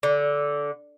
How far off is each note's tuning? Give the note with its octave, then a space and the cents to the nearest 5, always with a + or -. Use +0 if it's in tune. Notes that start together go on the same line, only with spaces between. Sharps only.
D3 -15